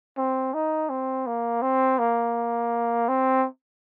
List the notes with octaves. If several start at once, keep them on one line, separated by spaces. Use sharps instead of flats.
C4
D#4
C4
A#3
C4
A#3
C4